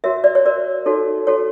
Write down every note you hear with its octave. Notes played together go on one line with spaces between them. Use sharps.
F#4 A#4 C#5 E5
D5
C#5
F#4 A#4 C#5 D5
D#4 F#4 A4 C#5
D#4 F#4 A4 C#5